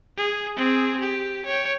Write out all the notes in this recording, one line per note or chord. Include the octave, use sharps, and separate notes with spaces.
G#4
C4 G#4
G4
C#5 G5